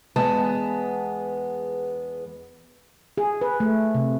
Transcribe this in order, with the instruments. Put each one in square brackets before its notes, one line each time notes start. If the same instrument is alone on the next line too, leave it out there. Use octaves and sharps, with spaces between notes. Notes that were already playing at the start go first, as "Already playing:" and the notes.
[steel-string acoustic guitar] E2 G#3 B3 A5
[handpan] G#4
B4
A3
C3